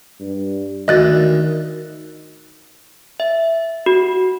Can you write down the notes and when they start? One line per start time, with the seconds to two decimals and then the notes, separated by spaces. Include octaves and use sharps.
0.20 G2
0.88 D2 D#3 D#5 F#6 A6
3.20 E5
3.86 F#4